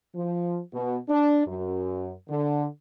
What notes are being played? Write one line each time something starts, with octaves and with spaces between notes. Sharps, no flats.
F3
B2
D4
F#2
D3